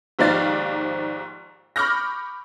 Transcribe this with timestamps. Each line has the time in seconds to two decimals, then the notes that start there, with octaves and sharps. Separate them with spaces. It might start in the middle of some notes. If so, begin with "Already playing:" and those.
0.19 D#2 G#2 F3 D5 F5 A6
1.76 B5 C#6 D6 F6 G6 A#6